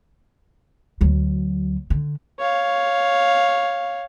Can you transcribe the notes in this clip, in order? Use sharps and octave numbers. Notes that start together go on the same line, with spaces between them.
D2 F#3
D3
C#5 F5